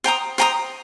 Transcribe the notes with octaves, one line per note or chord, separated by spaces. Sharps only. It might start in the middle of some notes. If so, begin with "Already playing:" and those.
C5 G5 A#5 D#6
C5 G5 A#5 D#6